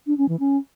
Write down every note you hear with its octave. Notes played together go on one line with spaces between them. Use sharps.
D4
C#4
E3
C#4